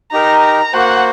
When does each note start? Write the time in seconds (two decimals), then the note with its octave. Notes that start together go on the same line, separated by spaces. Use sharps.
0.12 D#4 G4 A#4 A#5
0.43 A#5
0.73 A#3 F#4 C5 F#5